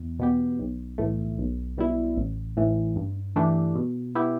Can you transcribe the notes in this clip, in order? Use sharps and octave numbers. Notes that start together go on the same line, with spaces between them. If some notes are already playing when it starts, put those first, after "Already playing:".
Already playing: E2
B2 B3 G4
B1
A2 E3 A3
B1
B2 G3 E4
A1
A2 E3
G2
E3 A3 D4 G4
B2
B3 E4 G4